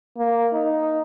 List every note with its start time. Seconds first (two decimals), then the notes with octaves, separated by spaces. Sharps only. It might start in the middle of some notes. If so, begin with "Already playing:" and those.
0.18 A#3
0.53 D#4